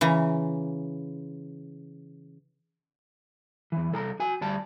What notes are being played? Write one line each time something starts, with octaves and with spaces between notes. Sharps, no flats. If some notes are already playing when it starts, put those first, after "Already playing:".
C#3 E3 A#5
E2 E3
C2 A4 A5 A#5
F#4 G#5
D2 G3 A5